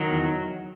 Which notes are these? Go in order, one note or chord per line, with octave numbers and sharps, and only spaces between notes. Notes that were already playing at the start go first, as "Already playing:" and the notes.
Already playing: D#3 F#3
E2